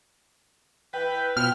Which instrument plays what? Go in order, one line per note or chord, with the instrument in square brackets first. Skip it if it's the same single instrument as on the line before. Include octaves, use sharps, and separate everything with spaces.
[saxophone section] E3 E4 B4 [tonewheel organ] G5
[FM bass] B2 [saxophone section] F3 [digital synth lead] F6